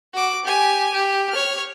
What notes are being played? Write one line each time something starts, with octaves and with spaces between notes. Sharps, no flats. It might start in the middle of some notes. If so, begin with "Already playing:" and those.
F#4 D6
G4 G#5
G4
C#5 F6